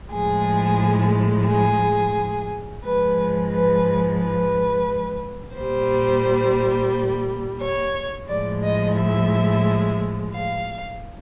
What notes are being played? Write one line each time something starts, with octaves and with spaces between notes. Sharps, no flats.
A2 F3 G#3 G#4
G#4
G#2 F3 G#3 B4
B4
B4
A#2 G3 C5
C#5
A2 F3 G#3 D5
D#5
E5
F5